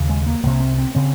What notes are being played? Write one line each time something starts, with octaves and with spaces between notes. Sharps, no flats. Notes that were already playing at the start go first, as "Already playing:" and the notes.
Already playing: D#2 C#3
G#3
A#3
C2 C3 A#3
C4
C4
C#3 C4